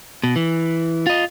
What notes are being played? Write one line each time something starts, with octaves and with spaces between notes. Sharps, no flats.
B2
E3
F4 D#5